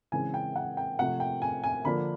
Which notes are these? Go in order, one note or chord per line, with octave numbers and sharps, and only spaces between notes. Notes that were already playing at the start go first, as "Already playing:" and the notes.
C#3 E3 G#3 C4 G#5
G5
F#5
G5
C3 F3 A3 F#5
G5
G#5
G#5
D3 F3 A#3 D4 B5